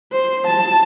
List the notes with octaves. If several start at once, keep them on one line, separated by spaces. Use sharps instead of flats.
C5
A5